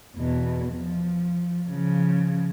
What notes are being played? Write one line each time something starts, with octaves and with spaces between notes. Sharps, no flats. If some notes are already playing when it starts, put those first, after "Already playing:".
E2 B2
F3
C#3 F3